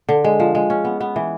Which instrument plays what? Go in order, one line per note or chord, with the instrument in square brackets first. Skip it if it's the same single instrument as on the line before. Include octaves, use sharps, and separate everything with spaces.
[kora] D3
G#3
F3
G#3
C#4
B3
B3
E3